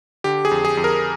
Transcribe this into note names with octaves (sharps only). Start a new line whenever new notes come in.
D3 G4
G#4
F2
G#4
F2
A#4